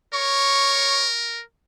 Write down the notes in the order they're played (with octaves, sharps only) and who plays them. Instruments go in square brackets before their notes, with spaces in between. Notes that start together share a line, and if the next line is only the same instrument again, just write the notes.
[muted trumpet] A#4 [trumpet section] C#5 C#6